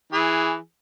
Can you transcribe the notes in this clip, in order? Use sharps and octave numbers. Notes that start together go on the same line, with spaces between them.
E3 G#4